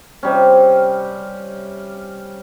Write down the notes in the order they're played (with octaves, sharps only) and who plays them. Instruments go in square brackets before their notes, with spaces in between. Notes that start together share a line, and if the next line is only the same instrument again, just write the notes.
[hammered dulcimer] C3 G3 C#4